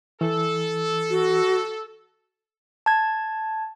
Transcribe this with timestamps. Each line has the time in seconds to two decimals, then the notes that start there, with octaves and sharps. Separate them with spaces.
0.21 E3 A4
1.10 F#4
2.86 A5 G#6